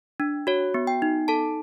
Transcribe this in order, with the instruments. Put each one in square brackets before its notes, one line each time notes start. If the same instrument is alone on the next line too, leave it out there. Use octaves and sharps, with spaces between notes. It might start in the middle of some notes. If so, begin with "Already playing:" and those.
[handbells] D4
F#4 C#5
B3
G5
D#4
A4 A5